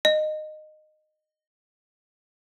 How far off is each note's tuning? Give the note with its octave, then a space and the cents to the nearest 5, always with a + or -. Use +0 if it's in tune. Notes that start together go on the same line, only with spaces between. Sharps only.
D#5 -15